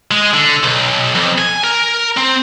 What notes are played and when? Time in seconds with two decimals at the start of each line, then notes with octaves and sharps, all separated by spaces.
0.11 G#3
0.33 D3
0.63 B1
1.15 F2
1.38 G#5
1.64 A#4
2.17 C4